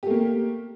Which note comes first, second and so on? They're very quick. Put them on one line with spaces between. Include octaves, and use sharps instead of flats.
G4 A3 A#3